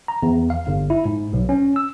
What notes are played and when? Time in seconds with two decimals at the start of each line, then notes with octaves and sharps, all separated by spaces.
0.08 A#5
0.23 E2
0.50 F5
0.67 G1
0.90 E4
1.05 G#2
1.33 B1
1.49 C#4
1.76 E6